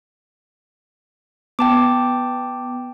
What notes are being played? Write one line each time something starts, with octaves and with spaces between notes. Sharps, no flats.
B3 G5 A5 D6